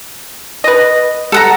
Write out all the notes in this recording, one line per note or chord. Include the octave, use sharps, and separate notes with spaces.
B4 D#5
A4 F#5 A#5